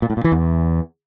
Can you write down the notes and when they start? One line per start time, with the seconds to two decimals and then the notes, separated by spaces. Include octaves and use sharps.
0.02 A#2
0.10 A2
0.17 A#2
0.24 E3
0.32 E2